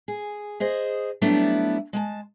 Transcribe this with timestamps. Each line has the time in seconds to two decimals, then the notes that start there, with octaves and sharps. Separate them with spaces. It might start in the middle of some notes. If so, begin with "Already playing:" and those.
0.08 G#4
0.60 G#4 C5 D#5
1.22 F#3 G3 A3 B3 D4 E4
1.93 G#3 G#5 A5